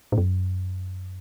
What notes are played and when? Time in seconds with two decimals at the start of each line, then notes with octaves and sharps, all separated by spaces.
0.12 A2
0.18 F#2